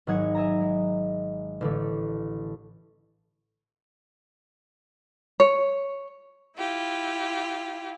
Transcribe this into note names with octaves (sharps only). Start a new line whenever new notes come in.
G#1 F#3 D#4 F#5 G#6
D#5 E5 G#5 A#5
G#3
A1 D3 A3
C#5
E4 F4 G4